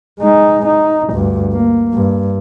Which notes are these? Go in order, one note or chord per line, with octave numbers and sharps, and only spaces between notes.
G#3 D#4
D#4
D2 G2
A#3
G2